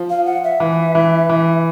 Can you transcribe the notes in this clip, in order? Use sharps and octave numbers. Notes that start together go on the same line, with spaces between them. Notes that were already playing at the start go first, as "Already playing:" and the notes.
Already playing: F3
F5
F#5
E5
E3
E3
E3